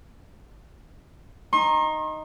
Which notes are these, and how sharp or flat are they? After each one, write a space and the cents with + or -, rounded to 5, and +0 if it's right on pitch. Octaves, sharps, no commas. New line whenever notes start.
D#4 +0 C6 +45